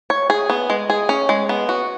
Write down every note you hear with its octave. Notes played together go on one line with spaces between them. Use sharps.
C#5
G#4
B3
G#3
G#4
C#4
G#3
B3
F#4